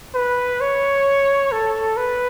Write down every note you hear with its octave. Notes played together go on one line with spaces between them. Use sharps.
B4
C#5
A4
B4